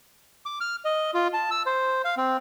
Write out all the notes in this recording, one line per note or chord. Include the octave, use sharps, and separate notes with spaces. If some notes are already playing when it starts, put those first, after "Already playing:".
D6
F6
D#5
F4
A5
E6
C5
F5
C4